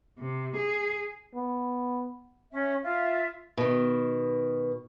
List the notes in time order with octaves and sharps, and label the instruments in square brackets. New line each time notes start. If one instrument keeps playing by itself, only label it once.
[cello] C3
G#4
[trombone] B3
[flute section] C#4 E5
F4 E5
[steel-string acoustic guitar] B2 D#3